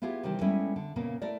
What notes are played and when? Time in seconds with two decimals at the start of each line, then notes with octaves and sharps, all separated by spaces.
0.02 B3 E4 F4 G4 G#4
0.23 C3 D#3 E3 G3 G4
0.41 G3 G#3 B3 C#4 E4 A4
0.76 D3
0.96 A#2 C#3 A#3 B3
1.22 A3 E4 A#4 D5